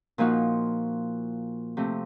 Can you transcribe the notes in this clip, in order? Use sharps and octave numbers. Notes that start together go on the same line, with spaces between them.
A#2 F3 A#3 D#4 F#4
C3 F3 A3